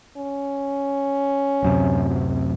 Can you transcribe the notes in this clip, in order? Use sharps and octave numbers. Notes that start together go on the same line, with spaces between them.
C#4
D1 F#2 C3